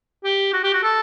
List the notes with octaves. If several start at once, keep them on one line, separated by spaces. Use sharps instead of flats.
G4
F#4
G4
F#4
A4